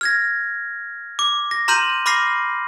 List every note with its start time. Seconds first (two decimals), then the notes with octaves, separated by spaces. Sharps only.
0.01 F6 G#6 A#6
1.19 D6
1.51 A#6
1.68 A#5 C6 F6 G6 D#7 F#7
2.06 B5 D6 F6 A#6 C7